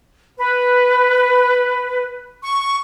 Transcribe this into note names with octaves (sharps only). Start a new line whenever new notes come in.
B4
C#6